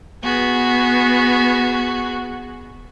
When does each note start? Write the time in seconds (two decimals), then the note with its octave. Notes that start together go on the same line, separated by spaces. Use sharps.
0.24 B3 F#4 G#4